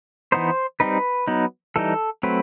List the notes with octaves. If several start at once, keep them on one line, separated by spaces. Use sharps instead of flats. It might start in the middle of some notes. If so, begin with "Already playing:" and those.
E3 B3 D#4 C5
G3 C4 D#4 B4
F#3 B3 D#4
E3 G3 D#4 A4
F#3 A3 C4 B4